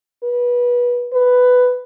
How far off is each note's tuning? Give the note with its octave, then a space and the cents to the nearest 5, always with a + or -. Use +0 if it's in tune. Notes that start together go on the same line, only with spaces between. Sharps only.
B4 -25
B4 +10